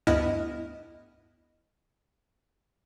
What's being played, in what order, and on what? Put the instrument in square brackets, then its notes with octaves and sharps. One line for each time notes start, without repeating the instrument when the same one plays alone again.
[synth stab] D2 G2 B3 E4 D#5 F6